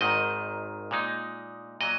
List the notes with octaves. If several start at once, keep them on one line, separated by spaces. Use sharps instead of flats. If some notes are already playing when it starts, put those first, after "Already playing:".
G#1 G#2 D#3 D#5
A#2 G#3 D#4
A#2 F#3 D#5